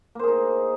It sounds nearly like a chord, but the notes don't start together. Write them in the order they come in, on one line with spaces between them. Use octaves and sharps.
A#3 C5 G#4 D#4